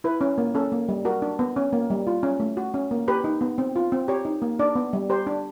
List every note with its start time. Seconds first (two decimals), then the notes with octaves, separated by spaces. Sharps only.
0.04 E4 B4
0.21 C#4
0.38 A#3
0.55 C#4 A4
0.72 A#3
0.89 G3
1.05 F#4 A#4
1.22 D4
1.39 B3
1.56 C#4
1.73 A#3
1.90 G3
2.07 F4
2.23 C#4
2.40 A3
2.57 F#4
2.74 C#4
2.91 A#3
3.08 G4 B4
3.24 D#4
3.41 B3
3.58 C4
3.76 F4
3.92 C4
4.08 G4 C#5
4.25 D#4
4.42 A#3
4.59 D4 D5
4.75 B3
4.93 G3
5.10 G4 C5
5.27 D4